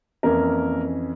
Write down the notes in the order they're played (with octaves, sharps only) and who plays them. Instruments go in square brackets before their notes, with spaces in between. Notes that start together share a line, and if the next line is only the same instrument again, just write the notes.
[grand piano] F2 E3 A#3 C#4 A#4